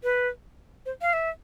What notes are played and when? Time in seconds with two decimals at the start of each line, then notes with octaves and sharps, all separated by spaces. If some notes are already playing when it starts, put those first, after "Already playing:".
0.03 B4
0.86 C5
1.02 F5
1.13 E5